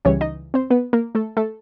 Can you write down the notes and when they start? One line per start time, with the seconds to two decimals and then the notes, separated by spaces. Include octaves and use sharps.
0.05 C#2 C#3 E3 G3 C#4 C#5
0.21 D#4 D#5
0.54 C4 C5
0.70 B3 B4
0.93 A#3 A#4
1.15 A3 A4
1.37 A3 A4